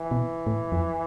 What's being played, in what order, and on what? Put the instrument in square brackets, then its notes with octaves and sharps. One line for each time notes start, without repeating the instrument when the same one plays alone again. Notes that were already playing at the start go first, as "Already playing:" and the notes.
Already playing: [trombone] E3
[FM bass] B2
A2
F2